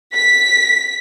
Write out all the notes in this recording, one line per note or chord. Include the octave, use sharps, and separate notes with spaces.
B6